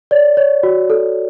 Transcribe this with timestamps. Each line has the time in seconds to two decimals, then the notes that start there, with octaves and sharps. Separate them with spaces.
0.11 C#5 D5
0.37 C#5
0.63 F#4
0.90 A4